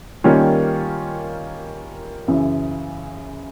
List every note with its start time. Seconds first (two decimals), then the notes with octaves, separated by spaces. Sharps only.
0.24 D#3 G3 A#3 C#4 F4
2.28 F#2 C#3 E3